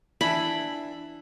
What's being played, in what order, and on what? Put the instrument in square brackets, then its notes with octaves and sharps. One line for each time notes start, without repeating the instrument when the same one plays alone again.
[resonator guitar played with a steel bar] E3 D4 E4 [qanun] B5